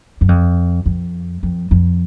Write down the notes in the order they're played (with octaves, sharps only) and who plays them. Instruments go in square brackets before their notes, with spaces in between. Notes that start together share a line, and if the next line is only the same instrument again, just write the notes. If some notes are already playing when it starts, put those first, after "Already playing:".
[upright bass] F#2
F2
F2
F2
F2